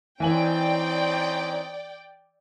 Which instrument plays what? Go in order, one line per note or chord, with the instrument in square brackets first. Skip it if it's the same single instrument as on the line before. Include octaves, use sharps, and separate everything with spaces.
[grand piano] E3 G#5 F#7 [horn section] C4 C#4 D#4 [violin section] D5 G5